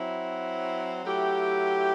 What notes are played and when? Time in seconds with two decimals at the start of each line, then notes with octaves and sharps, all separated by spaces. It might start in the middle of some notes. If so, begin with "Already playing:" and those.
Already playing: F#3 C4 E4
1.04 F#3 A3 E4 G4